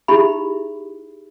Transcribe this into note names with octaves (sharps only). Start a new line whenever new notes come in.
D#4 E4 G4 G#4 E5 B5